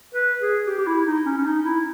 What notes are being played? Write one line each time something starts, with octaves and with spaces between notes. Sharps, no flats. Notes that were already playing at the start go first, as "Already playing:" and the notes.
B4
G#4
G4
G4
E4
D#4
C#4
C#4
D#4
E4